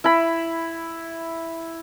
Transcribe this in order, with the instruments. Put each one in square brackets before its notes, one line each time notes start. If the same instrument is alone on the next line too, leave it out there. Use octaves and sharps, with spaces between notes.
[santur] E4 B5